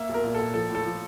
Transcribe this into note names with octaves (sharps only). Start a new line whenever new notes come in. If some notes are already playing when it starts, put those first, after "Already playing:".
Already playing: A#3 E5
B1
A#4
A#2
A#2 A4
F3 A4
A2
A4
F3